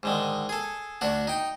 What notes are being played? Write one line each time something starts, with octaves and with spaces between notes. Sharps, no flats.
G#2 D3 D#3
G#4 A4
D2 D4 F#4
D#4 G5